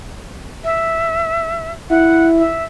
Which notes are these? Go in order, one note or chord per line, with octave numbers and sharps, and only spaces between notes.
E5
E4 F#5
E5